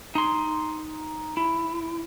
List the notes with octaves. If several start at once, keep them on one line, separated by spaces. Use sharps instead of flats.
D#4 C6
E4